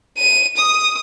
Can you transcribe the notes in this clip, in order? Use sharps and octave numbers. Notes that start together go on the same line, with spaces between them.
D#7
D#6